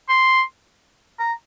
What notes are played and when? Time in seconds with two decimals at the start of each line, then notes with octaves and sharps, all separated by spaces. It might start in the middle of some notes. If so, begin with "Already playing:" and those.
0.09 C6
1.19 A#5